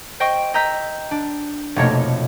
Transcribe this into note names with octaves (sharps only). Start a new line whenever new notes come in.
C5 D#5 G5 C#6
D#5 A#5 E6 G6 B6
D4
F1 B2 A3 A#3 C#5 C#7